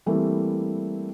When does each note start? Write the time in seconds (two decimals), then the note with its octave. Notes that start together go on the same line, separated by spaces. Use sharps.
0.06 E3 G3 A3 A#3 C4 E4